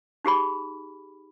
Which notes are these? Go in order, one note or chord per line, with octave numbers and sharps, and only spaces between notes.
D#4 G4 G#4 B5